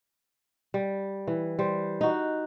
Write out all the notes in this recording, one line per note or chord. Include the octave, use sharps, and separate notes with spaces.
G3
E3
G3 C5
D#4 F#4